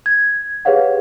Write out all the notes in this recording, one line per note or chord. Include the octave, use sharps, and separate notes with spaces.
G#6
G4 G#4 B4 C#5 F5 F#5